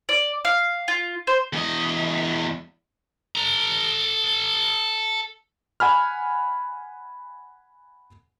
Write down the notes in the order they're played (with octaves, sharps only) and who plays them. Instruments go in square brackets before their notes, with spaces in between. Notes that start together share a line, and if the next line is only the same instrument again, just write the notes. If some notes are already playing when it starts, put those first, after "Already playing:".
[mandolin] D5
F5
F4
C5
[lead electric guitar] E2 D#5
[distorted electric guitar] A4 A#5
[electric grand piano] F#5 G#5 B5 F6